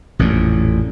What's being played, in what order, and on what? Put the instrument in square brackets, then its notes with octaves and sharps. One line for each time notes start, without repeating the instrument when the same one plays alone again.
[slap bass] A1 F2 A#2